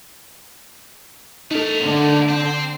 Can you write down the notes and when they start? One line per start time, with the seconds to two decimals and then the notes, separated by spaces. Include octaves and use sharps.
1.51 A3 D#4 A4 A#4
1.82 D3
2.29 C4